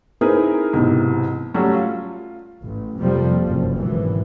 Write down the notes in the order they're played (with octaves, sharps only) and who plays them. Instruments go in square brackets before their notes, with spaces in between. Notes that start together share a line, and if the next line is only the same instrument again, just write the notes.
[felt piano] C4 D#4 E4 G#4 A#4 B4
B1 G#2 C3 E3
F#3 G3 A3 C#4 F#4
F4
[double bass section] A1
F2 C3 F3 G3 A#3
F#1 F3
G#1 B2 E3